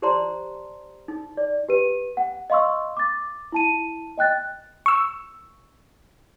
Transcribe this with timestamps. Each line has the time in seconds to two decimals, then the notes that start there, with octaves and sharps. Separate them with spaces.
0.02 G4 C5 D5 A5 A#5 C6
1.08 D#4
1.37 D5
1.69 G4 B4 D#7
2.17 F#5
2.50 D#5 F5 C6 C#6 E6
2.97 D6 A6
3.52 E4 A5 D#7
4.17 D#5 G5 F#6 A6
4.86 C#6 E6